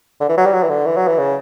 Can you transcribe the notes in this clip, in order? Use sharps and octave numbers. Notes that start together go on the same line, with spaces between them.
D3
E3
F#3
G3
F#3
E3
D3
E3
F#3
E3
C#3